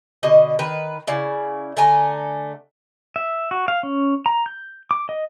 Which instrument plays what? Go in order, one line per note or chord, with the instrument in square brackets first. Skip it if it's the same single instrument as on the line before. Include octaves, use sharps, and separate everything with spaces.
[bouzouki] B2 D3 D#5
D#3 B4
C#3 E4 D5
D3 A3 G#5 A#5
[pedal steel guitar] E5
F#4
F5
C#4
A#5
G6
D6
D#5